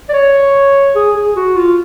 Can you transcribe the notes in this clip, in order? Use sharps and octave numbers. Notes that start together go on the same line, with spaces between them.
D5
C#5
G#4
G#4
F#4
F4